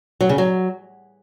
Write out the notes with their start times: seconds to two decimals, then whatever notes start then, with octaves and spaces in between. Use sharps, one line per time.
0.21 F#3
0.29 C#3
0.38 F#3